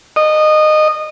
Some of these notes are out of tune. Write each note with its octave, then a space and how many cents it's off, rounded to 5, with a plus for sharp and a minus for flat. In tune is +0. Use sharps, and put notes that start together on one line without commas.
D#5 -20